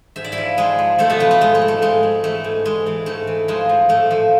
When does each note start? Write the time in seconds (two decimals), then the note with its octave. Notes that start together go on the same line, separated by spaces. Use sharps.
0.16 G#2 E5
0.24 D5
0.32 E4 E5
0.38 F3
0.57 F3 G#3 G#4
0.79 F3
0.98 F3 A3 A4
1.09 B2 B3
1.20 F3 A3
1.31 A3
1.41 G#2 G#3
1.55 A3
1.62 F3
1.68 A3
1.82 G#2 G#3
2.03 G#2
2.24 E3 A3
2.44 G#2
2.65 G#2 G#3
2.86 E3
3.06 G#2 A3
3.27 E3
3.48 F3 G#3
3.69 F3
3.89 A2 A3
4.11 F3